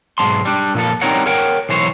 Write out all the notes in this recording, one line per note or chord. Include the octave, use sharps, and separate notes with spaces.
B1 G#2 A3 A5 C6
G3 D4
A#2 F3 A4
G3 C4 D#4 A#4 C#5 F#5
A#4 C#5 F#5 G5
B1 E3 C5 C#5